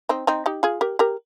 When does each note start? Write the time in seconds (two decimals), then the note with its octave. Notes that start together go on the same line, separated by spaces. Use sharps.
0.09 C4 D#4
0.27 C4 D#4
0.46 D#4 G4
0.63 F4 G#4
0.81 G4 A#4
0.99 G4 A#4